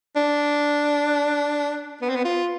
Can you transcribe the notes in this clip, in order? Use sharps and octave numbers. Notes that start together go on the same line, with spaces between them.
D4
B3
C4
B3
F4